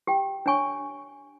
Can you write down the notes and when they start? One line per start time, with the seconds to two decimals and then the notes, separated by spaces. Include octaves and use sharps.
0.07 G4 G5
0.46 D4 C#5 G#5 C#6